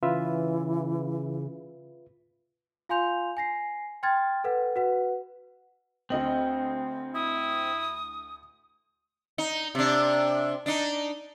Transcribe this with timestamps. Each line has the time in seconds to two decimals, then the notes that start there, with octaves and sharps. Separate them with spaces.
0.03 C#3 E3 F4 B4 E5
2.89 F4 F5 G#5 C6 G6 F7
3.37 G#5 A#6 C7
4.03 G5 C6 F6 G#6 A6
4.44 A4 B4 F#5
4.76 F#4 B4 F#5
6.10 D2 C4 D#5 F#7
7.14 E4 D#6
9.38 D#4
9.75 C3 D4
10.66 D4 D#4